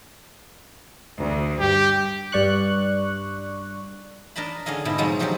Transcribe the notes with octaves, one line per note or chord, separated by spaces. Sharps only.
D2
G2 G4
G2 D5 C#6 F#6
D4 A#4 D#5 A5 B5
D3 C#4 G#4 D#5 F5
G#2 B2 D3 D4 E4
F3 F#3 G#3 C4 D#4
A#2 F3 F#3 G#3 F#4 G4